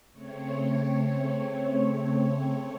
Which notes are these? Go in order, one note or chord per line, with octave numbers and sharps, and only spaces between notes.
C#3 A3 C4 C#5